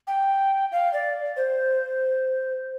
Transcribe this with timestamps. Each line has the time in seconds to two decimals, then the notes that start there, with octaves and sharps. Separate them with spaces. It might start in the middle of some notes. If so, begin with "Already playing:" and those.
0.07 G5
0.72 F5
0.93 D5
1.37 C5